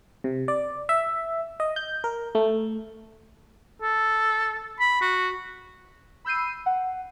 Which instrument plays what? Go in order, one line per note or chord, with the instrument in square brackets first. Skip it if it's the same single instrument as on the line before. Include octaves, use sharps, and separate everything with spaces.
[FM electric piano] C3
D5
E5
D#5
G6
A#4
A3
[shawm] A4
B5
F#4
[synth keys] B5 E6 G6 C7 D#7
F#5